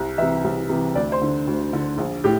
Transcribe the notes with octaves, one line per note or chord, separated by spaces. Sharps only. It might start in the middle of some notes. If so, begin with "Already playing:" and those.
Already playing: C2
C3 E3 E5
C2
C3 E3
D2 D5
C5
D3
D2
D3
A#1
A2 G4